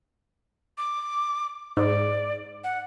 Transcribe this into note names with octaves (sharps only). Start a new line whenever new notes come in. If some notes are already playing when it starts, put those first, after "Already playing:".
D6
G#2 D5
F#5